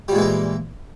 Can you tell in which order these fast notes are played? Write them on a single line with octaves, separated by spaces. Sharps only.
G3 A#2 G#3 E3 A#3